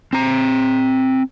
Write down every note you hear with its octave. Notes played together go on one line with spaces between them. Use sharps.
C4 A#5